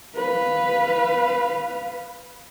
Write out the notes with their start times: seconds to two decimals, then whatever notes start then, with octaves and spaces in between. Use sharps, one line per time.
0.16 B4 F5